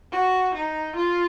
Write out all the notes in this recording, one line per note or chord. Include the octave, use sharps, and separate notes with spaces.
F#4
D#4
F4